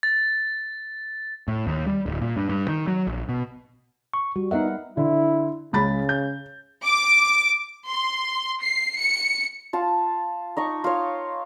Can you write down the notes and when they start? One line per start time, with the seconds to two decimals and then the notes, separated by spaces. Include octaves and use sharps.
0.03 A6
1.48 A2
1.67 D#2
1.86 G3
2.06 D1
2.21 A#2
2.37 G2
2.49 G2
2.68 D#3
2.87 F#3
3.07 A#1
3.29 B2
4.14 C#6
4.36 G3 F#4
4.51 B3 D#4 A#4 D#5 E5 F#5
4.97 D3 E4
5.73 C#2 C#3 B5 A6
6.09 G6
6.84 D6
7.86 C6
8.62 C7
8.99 C#7
9.73 F4 A5
10.57 D#4 D#5 C#6
10.84 F4 C#5